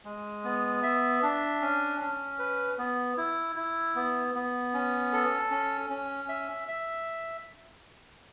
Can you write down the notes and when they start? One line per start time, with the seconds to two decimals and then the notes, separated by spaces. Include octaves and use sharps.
0.05 G#3
0.44 B3
0.83 E5
1.23 D4
1.61 C#4
2.00 C#4
2.39 B4
2.78 B3
3.17 E4
3.56 E4
3.95 B3
4.35 B3
4.74 C#4
5.13 A4
5.51 C#4
5.90 C#4
6.29 E5
6.68 E5